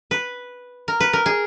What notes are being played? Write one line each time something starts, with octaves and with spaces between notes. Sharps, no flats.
B4
A#4
B4
A#4
G#4